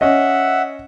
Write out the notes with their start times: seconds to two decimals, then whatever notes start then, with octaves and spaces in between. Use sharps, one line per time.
0.01 C#4 D#5 E5 F#5